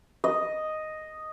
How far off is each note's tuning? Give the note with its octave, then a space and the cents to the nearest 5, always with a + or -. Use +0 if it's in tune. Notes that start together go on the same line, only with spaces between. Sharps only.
D#5 +0